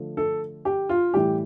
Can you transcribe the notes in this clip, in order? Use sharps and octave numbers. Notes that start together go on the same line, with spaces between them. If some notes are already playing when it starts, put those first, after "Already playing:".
Already playing: D3 F3 A3
A4
G4
F4
A2 E3 G3 G4